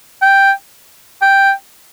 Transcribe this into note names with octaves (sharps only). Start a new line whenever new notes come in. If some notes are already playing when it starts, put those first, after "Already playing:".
G5
G5